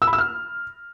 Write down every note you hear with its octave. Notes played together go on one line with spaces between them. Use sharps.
E6
B5
E6
F6